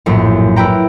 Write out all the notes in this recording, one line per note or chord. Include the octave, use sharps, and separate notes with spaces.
A#1 F#2 A2
E4 B4 G5 A#5